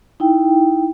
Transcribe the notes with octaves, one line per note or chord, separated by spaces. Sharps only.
D#4 E4 G5